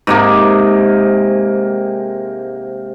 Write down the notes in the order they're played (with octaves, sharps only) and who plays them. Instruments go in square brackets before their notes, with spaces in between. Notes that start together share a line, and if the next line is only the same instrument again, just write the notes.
[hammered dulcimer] G#2 C3 A#3